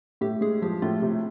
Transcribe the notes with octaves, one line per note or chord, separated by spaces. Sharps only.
A2 G4
G#3 G#4
F3 G4
A2 F4
C3